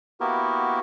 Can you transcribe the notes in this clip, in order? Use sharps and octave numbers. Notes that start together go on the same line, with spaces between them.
A#3 B3 E4 F#4 G4 A#4